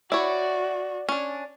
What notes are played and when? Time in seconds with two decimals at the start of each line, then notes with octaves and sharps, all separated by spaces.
0.12 E4 F#4 C#5 D5
1.09 C#4 D4 D5